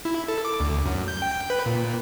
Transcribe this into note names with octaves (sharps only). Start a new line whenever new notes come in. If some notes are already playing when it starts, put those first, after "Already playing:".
E4
A4
D6
D2
F#2
G6
G5
B4
A#2